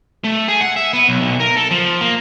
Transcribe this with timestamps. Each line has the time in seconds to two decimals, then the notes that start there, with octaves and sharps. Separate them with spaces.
0.24 A3
0.48 G#4
0.61 F#5
0.76 E5
0.93 B3
1.09 B1
1.21 B1
1.40 A#4
1.57 A4
1.71 F3
2.01 A#3